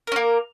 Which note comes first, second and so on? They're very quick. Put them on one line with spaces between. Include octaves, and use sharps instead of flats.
A#4 C#4 A#3